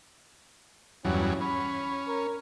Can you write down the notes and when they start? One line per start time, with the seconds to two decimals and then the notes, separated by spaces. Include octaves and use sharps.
1.05 E2 G2 F#3 C#4
1.41 C#4 B5
2.08 A#4